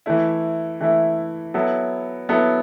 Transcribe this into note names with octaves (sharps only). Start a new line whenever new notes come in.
E3 A3 E4
E3 A3 E4
F#3 B3 E4 A4
F#3 B3 E4 A4